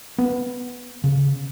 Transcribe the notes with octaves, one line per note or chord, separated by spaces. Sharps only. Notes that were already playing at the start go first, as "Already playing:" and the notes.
B3
C#3